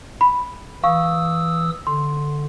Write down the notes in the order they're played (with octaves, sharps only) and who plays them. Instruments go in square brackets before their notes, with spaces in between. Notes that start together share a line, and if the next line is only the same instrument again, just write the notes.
[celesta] B5
[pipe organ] E3 D#6 E6 [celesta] F5 C#6
[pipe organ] D3 [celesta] C6